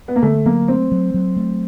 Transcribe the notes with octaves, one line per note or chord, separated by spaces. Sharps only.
B3
A#3
D3 A3
F#3 A#3
A3 C4
F#3
F#3
A3